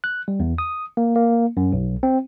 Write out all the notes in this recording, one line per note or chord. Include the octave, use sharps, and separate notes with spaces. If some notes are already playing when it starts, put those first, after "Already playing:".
F#6
G3
E2
D#6
A#3
A#3
F#2
B1
C4